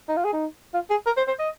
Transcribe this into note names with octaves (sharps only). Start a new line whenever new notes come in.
D#4
F4
G#4
D#4
F4
G#4
A#4
C5
C5
D#5